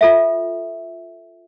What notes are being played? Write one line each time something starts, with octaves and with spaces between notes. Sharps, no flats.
F4 A4 E5